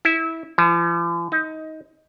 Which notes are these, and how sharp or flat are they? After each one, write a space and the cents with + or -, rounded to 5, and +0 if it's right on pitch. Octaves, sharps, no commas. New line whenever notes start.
E4 -15
F3 -45
D#4 +20